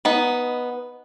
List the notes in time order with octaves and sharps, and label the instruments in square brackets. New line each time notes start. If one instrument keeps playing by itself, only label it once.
[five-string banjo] B3 D#4 B4